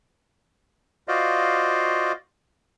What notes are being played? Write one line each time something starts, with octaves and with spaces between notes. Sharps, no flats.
F4 F#4 C5 D5 D#5 F5